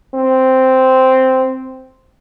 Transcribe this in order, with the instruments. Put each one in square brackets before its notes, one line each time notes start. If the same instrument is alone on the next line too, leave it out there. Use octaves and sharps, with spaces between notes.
[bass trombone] C4